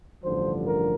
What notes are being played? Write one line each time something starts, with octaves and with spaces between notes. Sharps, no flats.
A1 G2 D3 F3 C5
A#4